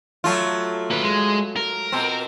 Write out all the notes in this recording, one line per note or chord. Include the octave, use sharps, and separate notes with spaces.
F#3 A3 F4
A#3 B4
G#3
A#4
B2 C4